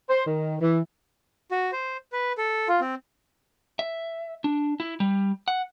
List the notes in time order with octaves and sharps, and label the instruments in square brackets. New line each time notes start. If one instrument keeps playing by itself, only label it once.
[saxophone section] C5
D#3
E3
[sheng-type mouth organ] F#4
C5
B4
A4
F4
C4
[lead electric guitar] E5
D4
E4
G3
F#5